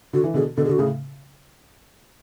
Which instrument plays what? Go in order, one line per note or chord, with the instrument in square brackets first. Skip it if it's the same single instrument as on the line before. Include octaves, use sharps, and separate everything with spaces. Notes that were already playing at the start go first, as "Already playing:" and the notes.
[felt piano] D3 [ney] F#4
[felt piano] E3
[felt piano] B2 D3 [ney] G#4
[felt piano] B2 D3 [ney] A4
[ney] G#4
[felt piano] D3 [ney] F#4
[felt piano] A2 C#3 [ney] G#4